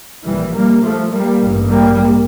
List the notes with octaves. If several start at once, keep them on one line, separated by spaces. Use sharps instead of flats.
A#1 A#2 E3 G3
G3 A#3
F3 A3
G3 A#3
A1 G2
G3 A#3